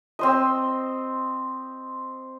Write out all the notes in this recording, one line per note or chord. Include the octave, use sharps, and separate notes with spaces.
C4 C5 D#5